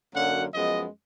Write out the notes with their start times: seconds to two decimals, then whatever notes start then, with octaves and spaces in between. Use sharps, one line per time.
0.14 F#2 D3 F#3 A#3 F#5
0.53 F#2 F3 G#3 B3 D#5